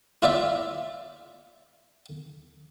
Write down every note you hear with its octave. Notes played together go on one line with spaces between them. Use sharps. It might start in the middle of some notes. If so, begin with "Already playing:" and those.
E4 F4 D5 E5